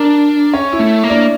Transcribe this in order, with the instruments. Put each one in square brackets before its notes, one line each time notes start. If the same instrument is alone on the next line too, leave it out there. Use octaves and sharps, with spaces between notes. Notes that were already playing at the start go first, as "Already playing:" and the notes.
Already playing: [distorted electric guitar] D4 [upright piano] A#4
[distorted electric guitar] C#4 [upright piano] C#5
[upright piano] E4
[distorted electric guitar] A3
A#3
[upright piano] D4